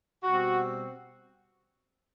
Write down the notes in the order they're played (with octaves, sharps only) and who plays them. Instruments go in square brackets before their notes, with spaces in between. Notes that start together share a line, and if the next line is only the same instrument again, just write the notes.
[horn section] B2 G3 C4 F#4